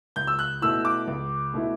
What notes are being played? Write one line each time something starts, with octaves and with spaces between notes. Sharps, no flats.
C#2 G6
E6
F#6
B2 A3 E4 E6
D6
C#2
B2 A3 E4